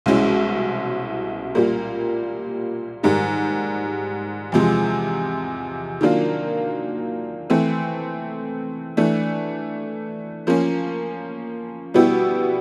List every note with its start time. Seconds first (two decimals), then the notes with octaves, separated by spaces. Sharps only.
0.06 C2 B2 G#3 C#4 E4
1.55 A#2 G3 A#3
3.03 G#2 D#3 G3
4.52 E2 C3 F3 G#3
6.01 D#3 F#3 A#3 D4 F4
7.50 E3 A3 C4
8.97 E3 A3 D4
10.47 F3 A#3 C#4
11.94 B2 G3 B3 E4 G4